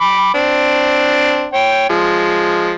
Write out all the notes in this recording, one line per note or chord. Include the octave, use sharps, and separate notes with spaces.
B5 D6
C4 D4
C#5 G5
F3 G#3